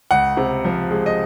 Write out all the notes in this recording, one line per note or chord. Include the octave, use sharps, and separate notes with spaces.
C#2 F#5
C3
F3
G#3
D#5